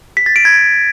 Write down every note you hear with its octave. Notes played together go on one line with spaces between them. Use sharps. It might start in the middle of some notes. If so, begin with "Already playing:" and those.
B6
A6
D7
G#6